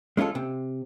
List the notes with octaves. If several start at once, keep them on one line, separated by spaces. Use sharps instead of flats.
G#3 C#4 E4 F4 A4
C3